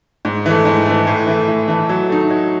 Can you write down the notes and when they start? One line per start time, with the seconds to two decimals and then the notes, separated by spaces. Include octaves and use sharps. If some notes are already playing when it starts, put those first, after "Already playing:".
0.25 G#2
0.46 E3 A3
0.65 G#2
0.86 E3 A3
1.07 A2
1.27 E3 A3
1.48 A2
1.68 E3 A3
1.89 F#3
2.09 A3 D#4
2.30 F#3